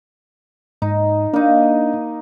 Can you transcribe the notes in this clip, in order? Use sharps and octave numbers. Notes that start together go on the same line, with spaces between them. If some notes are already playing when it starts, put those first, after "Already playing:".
G#2 D#4
A#3 D4 D#4